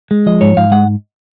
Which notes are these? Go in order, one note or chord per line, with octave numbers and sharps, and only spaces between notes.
G#3
F3 D#5
G#2 C#5
G#2 F5
G#3 F#5